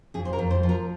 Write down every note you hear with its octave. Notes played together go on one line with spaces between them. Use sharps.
F2 G#4
C5
A#4
F2
C5
F3
A#4